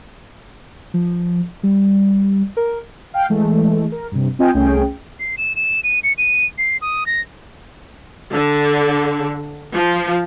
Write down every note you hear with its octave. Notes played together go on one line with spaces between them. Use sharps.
F3
G3
A#4
F5 G5
E3 G#3 A3
A#4
G2 C3
C4 F4 D#5 G5 G#5
C2 A3 C#4 G#4 G5
C7
E7
E7
D#7
C#7
D#7
C7
D#6
A#6
D3
F3